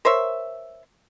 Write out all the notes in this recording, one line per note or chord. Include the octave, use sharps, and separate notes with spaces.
A#4 C5 C#5 E5